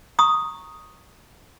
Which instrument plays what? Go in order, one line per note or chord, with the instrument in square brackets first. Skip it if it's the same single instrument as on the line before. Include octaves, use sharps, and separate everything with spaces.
[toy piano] A#5 C#6 D#6